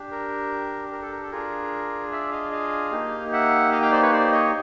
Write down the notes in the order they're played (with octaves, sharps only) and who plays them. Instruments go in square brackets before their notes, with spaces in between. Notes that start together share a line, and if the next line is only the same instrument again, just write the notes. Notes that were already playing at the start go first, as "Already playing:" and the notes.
Already playing: [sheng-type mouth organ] D4 G4
A#4
A#4
A4
A#4
A4
D4 F4 G#4 A#4
D5 E5
D#5 F5
D#5 F5
A#3 D#4 G4
E5 F#5
D#5 F5
F5 G5
C5 D5
B4 C#5
C5 D5
C#5 D#5